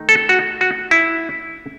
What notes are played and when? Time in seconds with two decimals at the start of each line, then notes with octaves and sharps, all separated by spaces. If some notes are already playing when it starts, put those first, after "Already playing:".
Already playing: D#3 A3 D#4
0.09 A4
0.29 F#4
0.61 F#4
0.91 E4